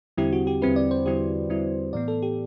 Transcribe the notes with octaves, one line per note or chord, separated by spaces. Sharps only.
E2 D3 G3 C4 E4 G4
F#4
G4
E2 D3 G3 C4 E4 B4
D5
C5
E2 D3 G3 C4 E4 G4
E2 D3 G3 C4 E4
A2 E3 B3 D5
A4
G4